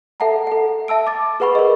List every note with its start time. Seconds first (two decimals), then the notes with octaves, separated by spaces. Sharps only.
0.20 A4 E5 F#5 A5 A#5
0.47 A4 F#5
0.88 E5 A5 E6 D7
1.07 D6 A6
1.40 G#4 B4 F#5 B5 C#6
1.55 A#4 D5 D#5